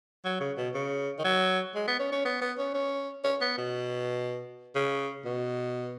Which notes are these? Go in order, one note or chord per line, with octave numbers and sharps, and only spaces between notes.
F#3
C#3
B2
C#3
D#3
F#3
G#3
B3
C#4
C#4
B3
B3
C#4
C#4
C#4
B3
B2
C#3
B2